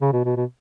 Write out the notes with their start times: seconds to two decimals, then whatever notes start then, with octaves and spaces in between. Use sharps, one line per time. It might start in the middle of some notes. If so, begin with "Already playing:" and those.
0.01 C#3
0.13 B2
0.25 B2
0.36 B2